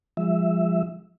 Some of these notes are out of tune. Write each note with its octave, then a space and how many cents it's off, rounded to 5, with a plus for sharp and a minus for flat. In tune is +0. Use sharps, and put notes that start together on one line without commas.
F3 +0 G#3 -30 E5 +0